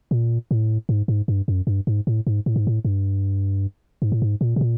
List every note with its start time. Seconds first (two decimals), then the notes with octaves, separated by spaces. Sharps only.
0.11 A#2
0.51 A2
0.89 G#2
1.08 G#2
1.28 G2
1.48 F#2
1.67 G2
1.87 G#2
2.07 A2
2.27 G#2
2.46 A2
2.56 G#2
2.67 A2
2.85 G2
4.02 G#2
4.12 A2
4.22 G#2
4.41 A#2
4.56 B2
4.61 A#2